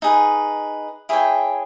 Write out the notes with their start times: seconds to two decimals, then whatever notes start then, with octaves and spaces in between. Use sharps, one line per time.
0.02 D#4 G#4 B4
1.09 E4 G#4 C#5 G5